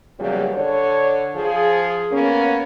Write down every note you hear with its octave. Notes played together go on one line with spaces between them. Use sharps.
E2 A#2 C#3 F#3 G3
D3 C#5
F3 G#4
A#3 B3 C#4